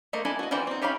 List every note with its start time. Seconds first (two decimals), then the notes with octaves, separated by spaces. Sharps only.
0.13 A3 A#3 C5 D#5
0.25 D4 E4 A4 G#5
0.39 F#4 D#5
0.51 E3 F#4 C5 D5 G5
0.67 C4 D#4
0.82 D#4 G4 C#5 F5 B5